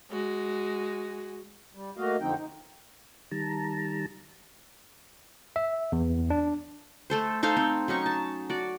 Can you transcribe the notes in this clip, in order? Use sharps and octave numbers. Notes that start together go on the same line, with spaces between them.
G#3 F#4
G3
A3 A#3 F#4 D#5 F5
F2 D3 F3 C4 D#4 G5
D#4
D#3 G3 A5 A#5
E5
E2
D4
A3 A4 C5
D#4 A4 C5 F5
C4
F#3 C#4 D#4 C#6
A5
F#4 D5